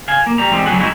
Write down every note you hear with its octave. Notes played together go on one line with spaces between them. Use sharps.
F5 G#5
A#3
G3 A#5
E3 G3 G#3 C4
D2 F#3 G#3 B3 G#4 F#5
G#3 B3 C4 D#4 E4 F#4